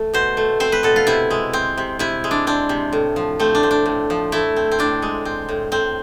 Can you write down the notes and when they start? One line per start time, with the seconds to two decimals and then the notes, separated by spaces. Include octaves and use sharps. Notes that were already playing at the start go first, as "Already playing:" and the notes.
Already playing: A3
0.14 B2 C5
0.37 A3
0.60 C4 C5
0.72 B4
0.83 B2 A4
0.96 F4
1.07 C3 E4
1.31 G#3
1.53 C4
1.78 C3
1.99 C3 E4
2.24 G#3
2.31 D4
2.47 C4 D4
2.69 C3
2.93 A2
3.16 F3
3.40 A3 C4
3.55 D4
3.63 C4
3.71 D4
3.86 A2
4.10 F3
4.32 A3 E4
4.56 C4
4.71 C4
4.79 A2 D4
5.02 G#3
5.25 C4
5.49 A2
5.72 A2 C4